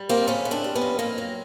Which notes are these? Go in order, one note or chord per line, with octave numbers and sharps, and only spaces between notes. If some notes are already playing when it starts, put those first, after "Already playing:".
Already playing: G3
F2 A#3 C4
C#3 B3 C#4
E3
C4 D4
G3
B3 C#4
F2
D#3 A#3 C4
F#3